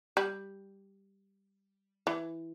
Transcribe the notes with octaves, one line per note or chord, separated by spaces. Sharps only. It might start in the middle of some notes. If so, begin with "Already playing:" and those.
G3
E3